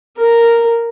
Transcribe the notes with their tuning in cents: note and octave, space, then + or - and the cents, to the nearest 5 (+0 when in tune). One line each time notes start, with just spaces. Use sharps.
A#4 -5